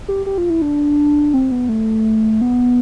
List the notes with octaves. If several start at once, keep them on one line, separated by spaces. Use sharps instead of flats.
G4
G4
F4
E4
D4
C4
B3
A3
B3